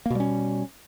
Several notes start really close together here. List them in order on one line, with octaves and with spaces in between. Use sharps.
A#3 B2 G3 C#4